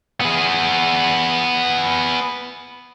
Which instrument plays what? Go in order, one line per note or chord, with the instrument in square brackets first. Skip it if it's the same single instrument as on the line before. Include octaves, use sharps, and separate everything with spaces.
[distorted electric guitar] B3 G#4